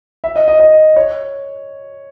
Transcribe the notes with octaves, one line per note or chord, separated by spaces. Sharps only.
E5
D#5
D#5
D#5
C#5